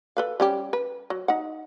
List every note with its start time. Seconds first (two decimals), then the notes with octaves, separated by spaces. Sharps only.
0.17 A4 B4 F5
0.40 G3 C#4 G4
0.73 B4
1.10 F#3
1.28 D#4 F#5